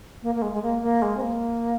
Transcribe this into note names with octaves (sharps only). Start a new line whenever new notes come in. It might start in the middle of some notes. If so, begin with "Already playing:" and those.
A#3
A#3
G#3
G#3
A#3
A#3
G#3
C4
A#3